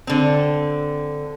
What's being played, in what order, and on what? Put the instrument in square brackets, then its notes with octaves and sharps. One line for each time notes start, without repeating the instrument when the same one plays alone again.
[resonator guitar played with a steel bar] D3 C4